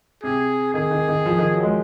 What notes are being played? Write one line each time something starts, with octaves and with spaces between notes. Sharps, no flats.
C3 G#4
D#3 G#4
D#3
D#3
F3
D#3
F#3
G#3